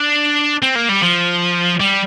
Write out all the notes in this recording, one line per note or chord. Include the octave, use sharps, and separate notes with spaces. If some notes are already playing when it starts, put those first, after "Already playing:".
Already playing: D4
C4
A#3
G3
F3
G3